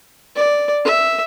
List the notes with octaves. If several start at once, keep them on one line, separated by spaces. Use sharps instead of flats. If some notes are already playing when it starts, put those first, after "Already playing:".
D5
E5